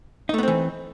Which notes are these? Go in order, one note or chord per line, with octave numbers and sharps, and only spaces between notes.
E3 A3 B3 C4 D#4